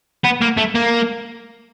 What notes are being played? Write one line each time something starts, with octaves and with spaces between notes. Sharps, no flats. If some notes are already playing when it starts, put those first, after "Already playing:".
B3
A#3
A3
A#3